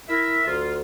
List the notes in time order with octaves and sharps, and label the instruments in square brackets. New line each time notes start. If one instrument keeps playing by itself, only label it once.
[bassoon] E4 [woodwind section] A#4 E5
[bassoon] D2 [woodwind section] F4